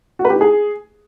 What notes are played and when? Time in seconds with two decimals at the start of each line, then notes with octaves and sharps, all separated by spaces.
0.19 F#4
0.25 B4
0.30 G4
0.35 D#4
0.41 G#4